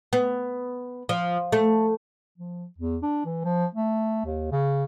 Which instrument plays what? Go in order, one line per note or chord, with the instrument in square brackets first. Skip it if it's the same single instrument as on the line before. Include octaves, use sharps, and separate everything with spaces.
[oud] B3
F3
A3
[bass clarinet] F3
E2
D4
E3
F3
A3
D#2
C#3